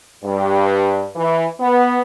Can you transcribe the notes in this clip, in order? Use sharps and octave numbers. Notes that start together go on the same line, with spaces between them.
G2
E3
B3